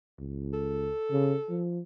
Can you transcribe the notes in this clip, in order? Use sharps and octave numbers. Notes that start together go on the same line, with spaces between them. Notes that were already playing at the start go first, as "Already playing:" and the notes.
C#2
A4
C#3
F3